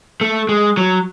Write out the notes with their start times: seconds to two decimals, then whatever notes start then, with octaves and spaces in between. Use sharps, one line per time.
0.21 A3
0.49 G#3
0.77 F#3